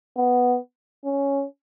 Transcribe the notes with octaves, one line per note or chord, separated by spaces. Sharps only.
B3
C#4